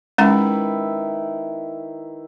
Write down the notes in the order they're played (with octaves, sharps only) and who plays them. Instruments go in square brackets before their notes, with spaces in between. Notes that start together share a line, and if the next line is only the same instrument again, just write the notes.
[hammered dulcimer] D#3 E4 B4 [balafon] G#3 C#4 F#5